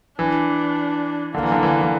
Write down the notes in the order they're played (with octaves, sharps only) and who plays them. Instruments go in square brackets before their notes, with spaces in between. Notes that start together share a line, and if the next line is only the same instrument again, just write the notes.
[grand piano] E3 [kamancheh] D4
[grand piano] D3 [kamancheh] A#3
[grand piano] E3
D3
E3
E3